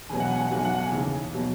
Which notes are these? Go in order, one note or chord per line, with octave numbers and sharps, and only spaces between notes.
E1 E2 B2 F#3 G#5
F#5
G#5
F#5
B1 B2 F#3 G#5
F#5
G#5
D#2 C#3 E3
B2 F#3